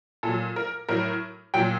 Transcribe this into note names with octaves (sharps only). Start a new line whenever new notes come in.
A#2 F#3 A4
A#4
A2 F#3 A#4
A#2 F#3 G5